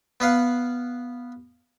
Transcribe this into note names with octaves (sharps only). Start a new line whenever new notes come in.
B3 B4 F5 F#5